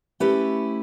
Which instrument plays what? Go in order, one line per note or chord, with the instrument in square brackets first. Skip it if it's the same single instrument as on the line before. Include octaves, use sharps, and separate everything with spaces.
[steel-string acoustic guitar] A3 C#4 E4 G4 B4